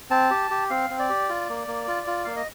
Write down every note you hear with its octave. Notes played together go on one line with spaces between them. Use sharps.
C4 A5
G4
G4
C4 F5
C4
D5
G4
F4
A#3
A#3
F4
F4
A#3 F5
D#5